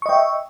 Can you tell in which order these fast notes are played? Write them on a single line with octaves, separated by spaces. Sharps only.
C#6 D#5 G5 E5